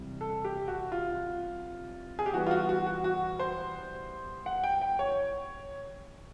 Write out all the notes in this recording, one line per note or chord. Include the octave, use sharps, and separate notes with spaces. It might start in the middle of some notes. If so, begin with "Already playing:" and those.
Already playing: C3 E3 G3
A4
G4
F#4
F4
G#4
G4
E3 G3 B3 F#4
F4
F#4
F#4
F#4
F#4
C5
F#5
G5
G5
C#5